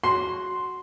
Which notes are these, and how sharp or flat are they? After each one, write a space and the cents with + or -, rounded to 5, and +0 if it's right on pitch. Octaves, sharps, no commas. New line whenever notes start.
F#4 +0 C6 +0